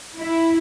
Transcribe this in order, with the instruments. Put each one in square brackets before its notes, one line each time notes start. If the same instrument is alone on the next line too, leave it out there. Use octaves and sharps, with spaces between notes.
[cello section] E4